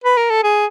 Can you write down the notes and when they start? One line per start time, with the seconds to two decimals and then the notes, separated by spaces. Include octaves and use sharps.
0.04 B4
0.17 A#4
0.30 A4
0.43 G#4